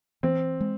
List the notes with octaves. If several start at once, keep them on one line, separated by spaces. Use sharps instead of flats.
E3 C4
G#3